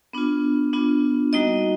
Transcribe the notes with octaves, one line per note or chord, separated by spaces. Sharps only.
B3 D4 F4
B3 D4 F4
G3 A#3 D#4 F#4 D#5